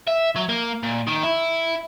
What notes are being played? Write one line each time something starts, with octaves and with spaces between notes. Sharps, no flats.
E5
F#3
A#3
A#2
D#3
E4